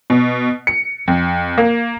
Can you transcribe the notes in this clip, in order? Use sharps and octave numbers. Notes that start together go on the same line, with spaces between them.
B2
C#7
F2
A#3